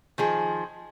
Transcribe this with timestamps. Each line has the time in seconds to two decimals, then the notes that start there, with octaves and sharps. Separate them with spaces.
0.18 D#3 F3 G#4